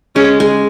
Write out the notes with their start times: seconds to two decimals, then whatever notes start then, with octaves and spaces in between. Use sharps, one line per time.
0.16 G#3 C#4
0.40 G#3